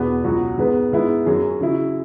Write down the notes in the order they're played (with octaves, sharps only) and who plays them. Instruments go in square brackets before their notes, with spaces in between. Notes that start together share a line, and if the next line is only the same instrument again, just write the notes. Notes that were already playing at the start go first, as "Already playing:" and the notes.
Already playing: [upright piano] E2 B2 B3 G#4 B4
C#2 B2 F#3 B3 F#4
G#2 G#3 B3 G#4 B4
G#2 G#3 B3 E4
F#2 F#3 C#4 G#4
C#3 F#3 E4 G#4